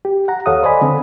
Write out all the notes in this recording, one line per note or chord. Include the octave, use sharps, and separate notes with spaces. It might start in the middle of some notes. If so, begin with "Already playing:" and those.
G4
F#5 A#5
D#2 A4 C#5 F5 F#5 D#6
C5 D5 D#5 G#5 B5
D3 C4 A4